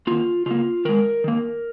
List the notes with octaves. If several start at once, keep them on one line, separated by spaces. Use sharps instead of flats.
D#3 A#3 F4
C#3 A#3 F4
D#3 G#3 A#4
D#3 A#3